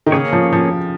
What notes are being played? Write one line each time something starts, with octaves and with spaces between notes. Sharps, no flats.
D#3
C#3 A#3 C#4 G#4 C#5
F3
F3